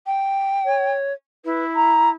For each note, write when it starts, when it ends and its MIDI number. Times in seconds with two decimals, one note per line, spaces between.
0.07 0.92 79
0.65 1.13 73
1.45 2.15 64
1.45 1.64 71
1.76 2.10 82